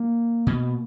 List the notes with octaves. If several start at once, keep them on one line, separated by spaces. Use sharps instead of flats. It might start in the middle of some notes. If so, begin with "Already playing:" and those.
Already playing: A#3
B2